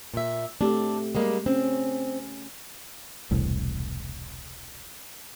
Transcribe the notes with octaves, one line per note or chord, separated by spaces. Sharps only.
A#2 E5
A3 C4 D4 G4 A4
G3 G#3 A#3
C4 C#4
E1 C2 A2